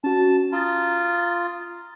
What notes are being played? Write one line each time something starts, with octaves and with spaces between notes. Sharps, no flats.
C#4 F#4 A5
F4 A#5 D#6 A6